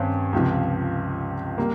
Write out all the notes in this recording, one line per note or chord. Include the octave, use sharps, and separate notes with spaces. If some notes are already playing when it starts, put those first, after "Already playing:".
Already playing: G2 D#3 C4 C#4
C#2 C3 F3
G3 A#3